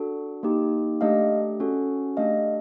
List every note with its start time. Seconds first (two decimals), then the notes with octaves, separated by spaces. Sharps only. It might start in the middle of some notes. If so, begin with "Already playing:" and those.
Already playing: D4 F#4 A4
0.43 A#3 D#4 G4
1.01 A3 D4 G4 D#5 F5
1.60 C#4 F#4 A4
2.17 A3 D4 G4 D#5 F5